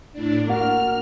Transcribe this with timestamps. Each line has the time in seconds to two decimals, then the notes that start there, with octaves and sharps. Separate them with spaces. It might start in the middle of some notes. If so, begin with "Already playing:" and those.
0.13 A2 D4
0.47 A#3 F#4 F6